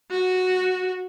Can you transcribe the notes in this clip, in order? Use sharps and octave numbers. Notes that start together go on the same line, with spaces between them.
F#4